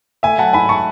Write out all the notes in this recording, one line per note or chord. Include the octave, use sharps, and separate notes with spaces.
A3 E5 G#5
F#3 F#5 A5
G#2 G#5 B5
A5 C#6